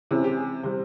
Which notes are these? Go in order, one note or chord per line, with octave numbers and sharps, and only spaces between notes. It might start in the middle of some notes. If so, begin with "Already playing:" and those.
C3 E3 G#3 C#4 E4
G4
G#4
C3 G3 C4 C5